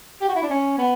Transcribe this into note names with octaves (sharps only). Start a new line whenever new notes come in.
G4
F#4
E4
D4
C#4
B3